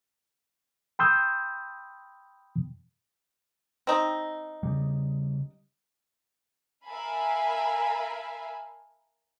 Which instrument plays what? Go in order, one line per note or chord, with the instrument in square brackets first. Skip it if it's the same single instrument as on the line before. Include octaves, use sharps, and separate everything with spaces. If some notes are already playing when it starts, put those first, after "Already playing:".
[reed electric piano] G5 B5 C6 D#6 E6 G6
[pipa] C4 D#4
[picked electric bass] C#3 G3
[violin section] A#4 E5 F5 G#5 A5 B5